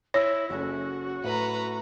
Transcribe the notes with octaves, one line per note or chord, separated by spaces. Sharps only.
E4 C#5 A#6
F#1 C#4 F#4 A4
A2 B4 A#5